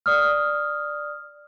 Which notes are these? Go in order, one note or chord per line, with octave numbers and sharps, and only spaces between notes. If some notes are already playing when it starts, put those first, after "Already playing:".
D5 D#6 F6